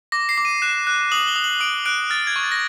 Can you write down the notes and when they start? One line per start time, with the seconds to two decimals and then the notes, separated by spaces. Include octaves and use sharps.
0.12 D6 A#6
0.29 C7
0.38 D6
0.45 D#7
0.62 F#6 E7
0.87 F#6
1.12 D#6 F#7
1.27 G7
1.36 D#6
1.44 F#7
1.60 D#6 D7
1.85 F#6 D7
2.10 F6 A6
2.27 G#6
2.36 C#6
2.43 A6
2.52 A#6